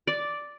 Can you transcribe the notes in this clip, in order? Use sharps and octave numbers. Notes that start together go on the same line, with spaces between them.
D5